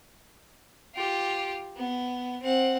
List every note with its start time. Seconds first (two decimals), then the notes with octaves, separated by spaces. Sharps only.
0.95 F4 G4
1.76 B3
2.42 C4 F#5